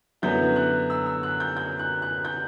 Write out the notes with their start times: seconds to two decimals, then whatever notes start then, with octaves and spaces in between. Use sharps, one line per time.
0.22 F#2 D3 F#3 B3 E4 G6
0.56 F#6
0.90 E6
1.06 E6
1.23 F#6
1.40 G6
1.57 G6
1.79 F#6
2.02 F#6
2.25 G6